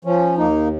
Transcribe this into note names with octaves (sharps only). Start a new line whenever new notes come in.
F3 C#4
D#2 A#3 D#4